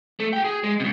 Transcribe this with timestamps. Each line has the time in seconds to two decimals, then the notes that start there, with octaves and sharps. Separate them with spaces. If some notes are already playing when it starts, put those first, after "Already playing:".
0.20 A3
0.33 G#4 G5
0.44 G#4
0.64 G#3
0.80 C#2 C3